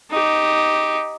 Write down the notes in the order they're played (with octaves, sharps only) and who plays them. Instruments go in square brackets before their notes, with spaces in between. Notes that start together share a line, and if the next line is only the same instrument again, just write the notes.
[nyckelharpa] D#4 G4